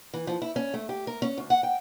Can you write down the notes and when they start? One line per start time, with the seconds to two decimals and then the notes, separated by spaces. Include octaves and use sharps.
0.14 E3
0.27 F3
0.42 E4
0.56 C#4
0.74 A3
0.89 G4
1.07 A#4
1.22 C#4
1.38 D2
1.50 F#5
1.63 G5